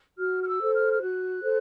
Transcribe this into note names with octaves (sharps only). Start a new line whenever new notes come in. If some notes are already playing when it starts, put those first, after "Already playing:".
F#4 F6
F6
E6
A4 C5
F6
F6
F#4 F#6
A4 C5